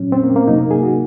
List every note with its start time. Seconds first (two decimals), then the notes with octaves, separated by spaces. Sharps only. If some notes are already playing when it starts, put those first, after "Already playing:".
Already playing: A#2 F#3 C#4
0.12 C4
0.24 A#3
0.36 A#3
0.47 C3 F#3 D#4
0.58 A#3
0.71 G#4
0.82 F#4